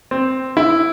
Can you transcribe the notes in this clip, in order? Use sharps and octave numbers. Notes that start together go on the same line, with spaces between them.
C4
E4